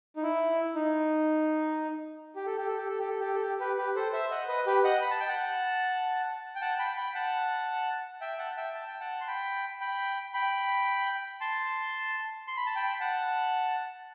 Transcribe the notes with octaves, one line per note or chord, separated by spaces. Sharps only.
D#4
E4
D#4
G4
A4
G4
A4
G4
A4
G4
A4
G4
A4
G4
G4 B4
G4 B4
A4 C5
C5 E5
D#5 F#5
B4 D#5
G4 B4
D#5 F#5
B5
A5
G5
F#5 A5
G5
F#5 A5
G5 B5
G5 B5
F#5 A5
E5 G5
F#5 A5
E5 G5
A5
G5
F#5 A5
C6
G5 B5
G5 B5
G5 B5
A5 C6
C6
B5
A5
G5 B5
F#5 A5